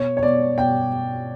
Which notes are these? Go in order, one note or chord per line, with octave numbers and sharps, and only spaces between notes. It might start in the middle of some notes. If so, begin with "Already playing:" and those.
Already playing: B2 C#5
C#5
B2 D5
B2 G5